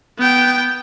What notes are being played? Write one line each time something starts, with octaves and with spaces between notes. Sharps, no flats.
B3 G5